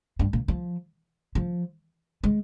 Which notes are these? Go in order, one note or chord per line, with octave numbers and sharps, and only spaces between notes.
G2
A#2
F3
F3
G#3